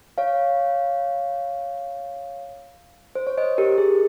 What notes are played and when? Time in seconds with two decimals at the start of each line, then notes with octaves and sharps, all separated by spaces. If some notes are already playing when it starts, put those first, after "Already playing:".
0.18 C#5 F5
3.15 C5
3.27 C#5
3.37 C5 D#5
3.58 G4 A#4
3.78 G#4